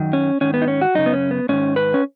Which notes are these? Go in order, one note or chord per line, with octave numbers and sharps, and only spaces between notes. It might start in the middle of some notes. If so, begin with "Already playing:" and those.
Already playing: F#2 D#3
C#4
G#2 D#3 C#4
B3
D#4
C#4
F#4
F#2 C#3 D#4
B3
C#4
B3
G#2 D#3 C#4
B4
C#4